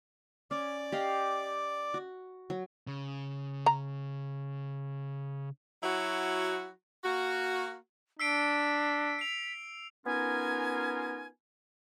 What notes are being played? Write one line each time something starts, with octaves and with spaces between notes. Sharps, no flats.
C#4 D5 D6
G4 D#5 F5
F#4
F#3
C#3
A#5
F#3 E4 F#4
A#3 F#4
D4 E6 B6 C7 D7
C7 F7
B3 C#4 D#4 F4 A#4 G#5